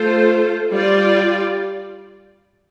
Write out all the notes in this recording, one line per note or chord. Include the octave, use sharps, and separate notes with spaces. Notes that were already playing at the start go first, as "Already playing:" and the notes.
Already playing: A3 F4 A4 C5
G3 F4 D5